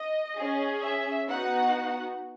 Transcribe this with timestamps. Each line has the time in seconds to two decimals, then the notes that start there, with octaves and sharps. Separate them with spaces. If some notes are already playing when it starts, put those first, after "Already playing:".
Already playing: D#5
0.37 C#4 G#4
0.83 E5
1.28 B3 D#4 F#4 F#5